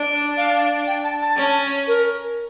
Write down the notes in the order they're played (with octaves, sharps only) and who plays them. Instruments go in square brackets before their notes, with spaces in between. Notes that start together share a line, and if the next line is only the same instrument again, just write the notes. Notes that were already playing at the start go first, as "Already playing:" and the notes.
Already playing: [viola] D4
[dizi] F5
G5
A5
A5
[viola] C#4
[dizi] A#4